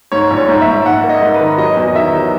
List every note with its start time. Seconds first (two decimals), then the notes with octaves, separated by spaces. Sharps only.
0.12 G#2 C#5
0.31 A#1
0.37 C#5
0.48 G#2
0.61 E5
0.68 G#2
0.85 G#2 F#5
1.04 A#3
1.09 D#5
1.22 G#2
1.34 B4
1.40 D#3
1.58 F#3 D#5
1.77 E2
1.95 D#3 E5
2.13 F#3